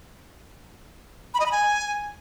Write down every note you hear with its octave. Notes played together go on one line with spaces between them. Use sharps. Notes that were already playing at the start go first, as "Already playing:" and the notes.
B5
D#5
B5
G#5